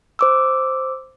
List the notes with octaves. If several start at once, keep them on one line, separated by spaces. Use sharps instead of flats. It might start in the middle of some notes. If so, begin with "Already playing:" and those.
C5 D6 E6